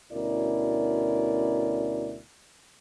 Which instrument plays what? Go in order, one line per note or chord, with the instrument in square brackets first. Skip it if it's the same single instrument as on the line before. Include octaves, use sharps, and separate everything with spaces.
[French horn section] D2 B2 C#4 E4 A#4 D5